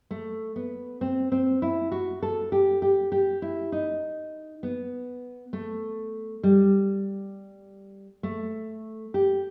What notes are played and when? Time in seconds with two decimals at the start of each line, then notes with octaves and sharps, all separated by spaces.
0.11 A3
0.56 B3
1.01 C4
1.32 C4
1.62 E4
1.92 F#4
2.22 A4
2.52 G4
2.82 G4
3.12 G4
3.42 E4
3.72 D#4
4.63 B3
5.53 A3
6.43 G3
8.23 A3
9.14 G4